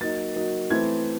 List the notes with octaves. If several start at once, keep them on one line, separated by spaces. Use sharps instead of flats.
F#3 A#3 D#4 A6
F#3 A#3 D#4
E3 A3 C4 E4 G#6